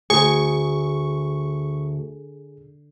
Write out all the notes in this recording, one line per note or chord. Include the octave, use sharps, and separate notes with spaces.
D2 G#4 C#6